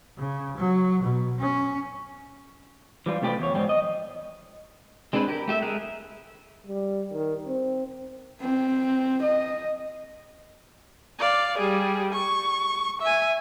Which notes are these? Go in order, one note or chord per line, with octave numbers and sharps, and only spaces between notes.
C#3
F#3
B2
C#4
E3 G3 F4
C3 A3 F4 G4 B4
E2 C#5
F2 G#2 G3 C4
D#5
G#3 C4 D4 G#4 B4
G4 A#4
A3 G4 E5
G#3 A3 G#4 A#4 F#6
G3
D#3
C4
C4
D#5
D5 F5
G3 G#4
C#6
E5 G#5